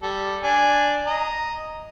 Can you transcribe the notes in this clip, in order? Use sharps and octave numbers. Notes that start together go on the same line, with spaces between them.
G3 A4
D4 G#5
D#5 A#5